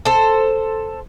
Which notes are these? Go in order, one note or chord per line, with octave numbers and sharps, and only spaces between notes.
A4 C5